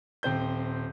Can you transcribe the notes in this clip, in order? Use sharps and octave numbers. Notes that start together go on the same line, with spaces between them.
D#1 C4 C5 G6